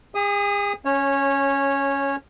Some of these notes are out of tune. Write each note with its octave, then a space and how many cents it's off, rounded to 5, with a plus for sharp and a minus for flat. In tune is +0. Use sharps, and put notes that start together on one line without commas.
G#4 -40 D#6 +0
C#4 +0 C#5 -15